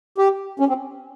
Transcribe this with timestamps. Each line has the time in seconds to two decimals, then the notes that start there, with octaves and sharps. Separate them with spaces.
0.18 G4
0.60 C#4
0.68 C4